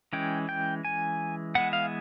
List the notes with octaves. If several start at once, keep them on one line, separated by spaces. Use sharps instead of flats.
E3 G#3 C#4 G5
G5
G#5
E3 G#3 B3 F#5
F5